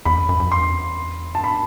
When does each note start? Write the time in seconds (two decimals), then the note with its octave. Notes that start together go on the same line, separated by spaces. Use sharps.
0.05 E2 B5
0.17 F#2
0.29 F#2
0.40 F#2
0.52 E2 C6
1.35 G2 A5
1.44 A2 B5